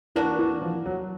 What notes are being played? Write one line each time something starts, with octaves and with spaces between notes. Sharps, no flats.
E3 A#3 D4 F#4
E3
F3
F#3